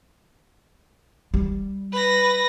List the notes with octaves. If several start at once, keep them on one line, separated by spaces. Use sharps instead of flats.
G3
B4 A#6